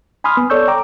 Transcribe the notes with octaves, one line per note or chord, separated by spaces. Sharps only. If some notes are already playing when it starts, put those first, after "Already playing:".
G#5 B5 C6 D#6 F6
B3
A4 C#5 D5 C#6 E6 G6
G5 A#5 D6